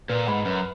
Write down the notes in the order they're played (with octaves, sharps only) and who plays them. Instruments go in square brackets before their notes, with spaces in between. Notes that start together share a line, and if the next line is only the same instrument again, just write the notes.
[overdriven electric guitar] A#2 [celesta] B4
[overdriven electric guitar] G#2 [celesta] F#5 B5
[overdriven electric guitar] F#2 [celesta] B4